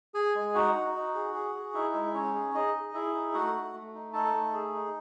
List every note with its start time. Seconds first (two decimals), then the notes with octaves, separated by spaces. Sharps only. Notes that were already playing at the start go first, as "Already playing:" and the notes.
0.14 G#4 G#5
0.35 G#3
0.55 D#4 F#4 F#5
0.75 D#4
0.94 D#4
1.15 G#4
1.34 G#4
1.55 G#4
1.74 D#4 E4 E5
1.94 G#3
2.14 C#4 D#4 C#5
2.34 G#4
2.54 D#4 G#4 D#5
2.74 G#4
2.94 E4 G#4 E5
3.14 D#4
3.34 A3 F#4 F#5
3.53 A3
3.74 A3
3.94 D#4
4.13 D#4 A4 A5
4.33 A3
4.53 G#4
4.73 D#4